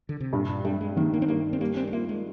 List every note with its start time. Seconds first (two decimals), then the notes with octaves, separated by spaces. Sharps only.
0.09 D3
0.20 C3
0.33 G2 A#2
0.49 A#2
0.65 G2 G3
0.81 G#3
0.96 D#3 A#3
1.14 A#3
1.22 C4
1.28 G2 A#3
1.53 C4
1.61 G3 A#3
1.77 C4
1.88 G#3
1.93 A#3 F4
2.09 G#3